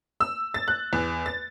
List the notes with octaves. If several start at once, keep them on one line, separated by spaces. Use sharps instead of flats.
E6
A6
F#6
E2
A6